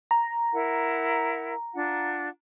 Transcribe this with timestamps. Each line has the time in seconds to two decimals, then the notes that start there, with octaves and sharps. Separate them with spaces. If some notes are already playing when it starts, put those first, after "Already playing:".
0.11 A#5
0.53 E4 A#4 F#5
1.74 D4 F4 F#5